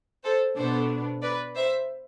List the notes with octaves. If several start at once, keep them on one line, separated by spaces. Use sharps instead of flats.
A4 C5
B2 B3 D4 A4 C5
B4 D5
C5 E5